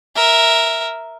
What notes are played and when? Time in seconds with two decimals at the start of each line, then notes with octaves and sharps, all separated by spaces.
0.16 A#4 E5